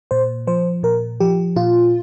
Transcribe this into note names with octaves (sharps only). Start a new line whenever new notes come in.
A#2 C5
F3 C5
A#2 A#4
F3 G4
A#2 F4